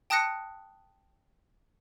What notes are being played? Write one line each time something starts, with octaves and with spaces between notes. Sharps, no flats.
G5 A5 D#6 F#6 A#6 C#7